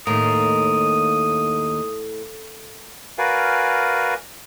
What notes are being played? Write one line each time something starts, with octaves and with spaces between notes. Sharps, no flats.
D#2 A2 A#4 D#6
F#4 A#4 B4 D5 F5 G#5